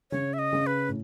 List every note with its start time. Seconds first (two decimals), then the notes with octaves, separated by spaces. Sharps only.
0.11 C#3 C#5
0.33 E5
0.39 D#5
0.52 C#3
0.67 B4
0.88 A2